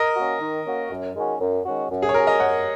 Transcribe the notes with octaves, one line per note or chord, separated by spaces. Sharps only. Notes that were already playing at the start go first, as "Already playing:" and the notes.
Already playing: A#4 D#5
A#3 C#4 F#4
D#3
A#3 C#4 F#4
F#2
D#3 G#3 C#4 F#4
F#2
D#3 G#3 C#4 F#4
F#2
G#4
C#5
F#3 C#4 G#4 A#4
A#4 D#5
F#2 C#5 F#5